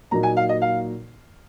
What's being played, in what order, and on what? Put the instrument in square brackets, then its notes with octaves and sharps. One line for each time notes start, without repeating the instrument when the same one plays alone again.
[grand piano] A#2 F#3 A#3 D#4 [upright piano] A#5
[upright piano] G#5
F5
D#5
F5